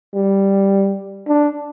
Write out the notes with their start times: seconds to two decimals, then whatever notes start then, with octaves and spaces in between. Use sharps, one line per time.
0.14 G3
1.28 D4